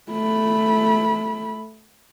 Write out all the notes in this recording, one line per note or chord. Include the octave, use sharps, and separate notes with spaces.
A3 B5